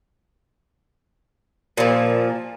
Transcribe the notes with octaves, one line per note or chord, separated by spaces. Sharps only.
A#2 F3